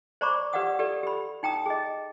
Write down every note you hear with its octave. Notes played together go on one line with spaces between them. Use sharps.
C5 D5 A#5 B5 C#6 D6
G4 B4 D5 F5 F#5 D#6
G4 A4 B4 D5
G4 B5
D#4 G5 A#5 D#6
G#4 D#5